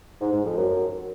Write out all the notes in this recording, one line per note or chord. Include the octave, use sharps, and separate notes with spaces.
G#2
G#2
F2
F#2